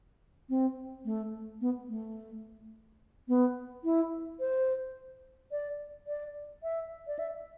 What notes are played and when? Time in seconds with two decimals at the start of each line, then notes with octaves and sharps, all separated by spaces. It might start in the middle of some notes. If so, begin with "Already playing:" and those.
0.49 C4
1.05 A3
1.61 B3
1.89 A3
3.28 B3
3.84 E4
4.40 C5
5.51 D5
6.07 D5
6.63 E5
7.07 D5
7.19 E5